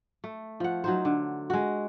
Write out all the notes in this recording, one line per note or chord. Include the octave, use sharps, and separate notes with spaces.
A3
F3 F#5
F#3 D#4 C5
D3
G#3 F#4